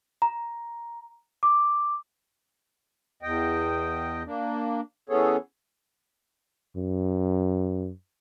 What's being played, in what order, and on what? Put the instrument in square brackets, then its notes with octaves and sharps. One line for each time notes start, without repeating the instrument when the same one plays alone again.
[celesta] A#5
D6
[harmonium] E2 D#5 G5
A#3 D4
E3 B3 C#4 G#4 A4 C#5
[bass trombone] F#2